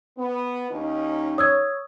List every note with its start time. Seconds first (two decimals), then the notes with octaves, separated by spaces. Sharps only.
0.18 B3
0.71 D#2 C#4 D#4
1.38 C#5 D#6 E6 G#6